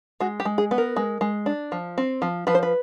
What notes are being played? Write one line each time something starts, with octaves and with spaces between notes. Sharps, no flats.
G#3 F#4
G4
G#3
G#4
B3
A#4
G#3
G#3
D4
F3
C4
F3
F3 B4
C5
B4